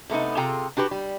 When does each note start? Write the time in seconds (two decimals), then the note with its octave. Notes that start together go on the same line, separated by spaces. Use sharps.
0.10 C3 A3 B3 D#4
0.37 C3 F4 G#4 A4 G5 A#5
0.77 D4 F#4 G4 B4
0.91 G3